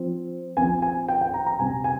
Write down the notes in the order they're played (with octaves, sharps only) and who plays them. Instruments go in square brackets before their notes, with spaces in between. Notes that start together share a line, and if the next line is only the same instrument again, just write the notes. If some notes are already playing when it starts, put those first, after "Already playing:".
Already playing: [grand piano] F3 C4
F3 C4 G#5
G#5
G5
G5
A#5
A#5
C3 G3 C4 G#5
G#5